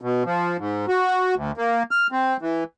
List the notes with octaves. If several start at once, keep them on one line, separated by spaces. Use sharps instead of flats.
B2
F3
G#2
F#4
D2
A#3
F6
C4
E3